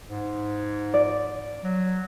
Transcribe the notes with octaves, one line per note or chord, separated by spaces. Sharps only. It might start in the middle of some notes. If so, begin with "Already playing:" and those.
G#2
D5
F#3